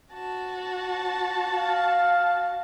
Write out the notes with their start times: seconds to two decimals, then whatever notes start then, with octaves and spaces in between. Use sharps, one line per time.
0.13 F#4 A5
1.51 F5